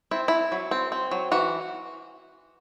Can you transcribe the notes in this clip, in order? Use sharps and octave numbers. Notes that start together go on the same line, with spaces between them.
C4 E4
C4 E4
F#3
C4
C4
F#3
E3 F#4